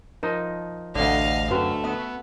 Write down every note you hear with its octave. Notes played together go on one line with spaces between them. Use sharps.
F3 D#4 A#4 D#5
A1 D2 D3 D5 D#5 F5
F#2 A3 C#4 F#4 B4
B3 E5 D#6